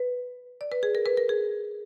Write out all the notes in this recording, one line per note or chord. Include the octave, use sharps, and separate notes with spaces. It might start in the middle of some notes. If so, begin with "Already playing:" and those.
Already playing: B4
D5
B4
G#4
A#4
B4
A#4
G#4